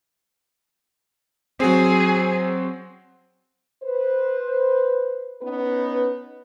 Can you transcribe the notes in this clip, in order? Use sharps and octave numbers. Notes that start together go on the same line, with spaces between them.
F#3 C4 G#4
B4 C5
B3 C#4 D#4 B4